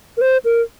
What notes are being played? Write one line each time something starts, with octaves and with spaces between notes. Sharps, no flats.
A#4
C5
A#4